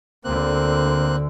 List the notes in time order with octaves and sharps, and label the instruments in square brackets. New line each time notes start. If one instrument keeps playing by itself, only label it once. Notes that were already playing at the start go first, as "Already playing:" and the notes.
[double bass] D2 D3 [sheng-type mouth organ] A#3 C4 F#6